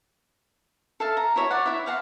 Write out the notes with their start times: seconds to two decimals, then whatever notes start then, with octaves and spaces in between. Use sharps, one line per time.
1.00 A4 E5 F5 A5
1.17 A#5
1.36 E4 F#4 C#5 E5
1.51 C#5 D5 F#5
1.66 E4 C#5 E5
1.86 F5 F#5 A5 C6